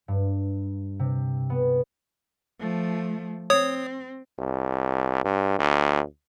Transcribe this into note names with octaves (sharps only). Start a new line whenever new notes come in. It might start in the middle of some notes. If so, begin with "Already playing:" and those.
G2
C3
B3
F3 A3
C4 C#5 D#6
C2
G2
D2